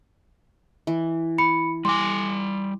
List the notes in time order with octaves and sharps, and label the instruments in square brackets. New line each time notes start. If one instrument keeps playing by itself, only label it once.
[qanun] E3
[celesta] B5 C#7
[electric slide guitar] G3 G#5 [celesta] C6 D6